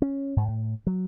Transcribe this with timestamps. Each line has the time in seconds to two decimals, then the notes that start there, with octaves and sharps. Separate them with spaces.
0.02 C#4
0.37 G#2
0.48 A2
0.87 F#3